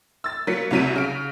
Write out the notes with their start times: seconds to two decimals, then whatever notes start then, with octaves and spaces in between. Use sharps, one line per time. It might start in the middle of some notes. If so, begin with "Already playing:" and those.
0.24 E6 A6
0.47 F#3 A#3 B6 C#7
0.71 C2 C3 F#3 B6 D#7
0.96 C#3 D7